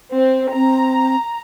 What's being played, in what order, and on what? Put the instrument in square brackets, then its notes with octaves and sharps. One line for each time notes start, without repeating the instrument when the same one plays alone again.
[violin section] C4
[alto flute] C4 [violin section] A#5